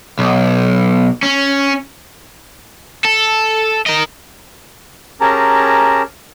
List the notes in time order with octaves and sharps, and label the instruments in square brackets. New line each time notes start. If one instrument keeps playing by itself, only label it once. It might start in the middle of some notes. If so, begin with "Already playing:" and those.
[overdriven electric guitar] B1
C#4
A4
A#4 D#5
[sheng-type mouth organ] C#4 G4 G#4 A#4 A5 A#5